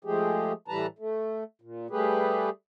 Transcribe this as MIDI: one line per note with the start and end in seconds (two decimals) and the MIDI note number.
0.05 0.53 53
0.05 0.53 56
0.05 0.53 57
0.05 0.53 67
0.05 0.53 68
0.68 0.86 45
0.68 0.86 52
0.68 0.86 55
0.68 0.86 71
0.68 0.86 81
0.68 0.86 82
0.99 1.44 57
1.62 1.87 46
1.90 2.50 55
1.90 2.50 57
1.90 2.50 67
1.90 2.50 68
1.90 2.50 71